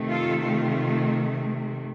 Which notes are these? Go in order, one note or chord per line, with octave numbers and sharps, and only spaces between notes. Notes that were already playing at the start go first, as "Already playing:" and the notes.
Already playing: C3 D#3 A3
F4 A4
F4